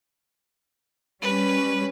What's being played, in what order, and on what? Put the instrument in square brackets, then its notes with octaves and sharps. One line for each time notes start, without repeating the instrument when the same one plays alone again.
[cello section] G3 C#4 [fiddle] B4